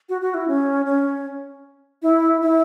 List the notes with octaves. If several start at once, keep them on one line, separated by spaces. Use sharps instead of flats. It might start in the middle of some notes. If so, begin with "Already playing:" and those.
F#4
F#4
E4
C#4
C#4
E4
E4